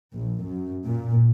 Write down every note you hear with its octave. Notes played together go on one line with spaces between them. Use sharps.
A#1
F#2
A#2